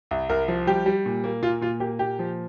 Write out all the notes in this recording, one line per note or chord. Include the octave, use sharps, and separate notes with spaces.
C2
C2 A#4
F3
G3 G4
G3
A#2
A#3
A#2 F4
A#2 F4
A#3 G4
A#2 G4
F3